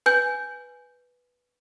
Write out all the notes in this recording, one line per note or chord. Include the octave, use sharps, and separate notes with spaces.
B4 G#5 G6